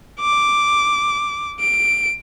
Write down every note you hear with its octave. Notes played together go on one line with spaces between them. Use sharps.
D6
D7